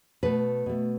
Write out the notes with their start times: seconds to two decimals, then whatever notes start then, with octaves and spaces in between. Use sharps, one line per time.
0.23 B2 A3 B4
0.66 B2 A3